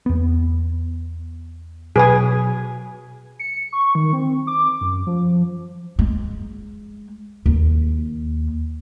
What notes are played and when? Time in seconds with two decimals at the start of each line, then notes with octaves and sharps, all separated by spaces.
0.06 E2 B3
1.96 B2 F#3 G#4 B4 G#5
3.39 C#7
3.73 C#6
3.95 D#3
4.13 C4
4.47 D6
4.81 F#2
5.07 F3
5.99 G#3
7.46 D#2